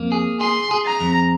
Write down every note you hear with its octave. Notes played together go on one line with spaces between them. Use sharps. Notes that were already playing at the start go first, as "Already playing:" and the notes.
Already playing: F2 A#3
G#4
G#4 C6
G#4
A#5
F2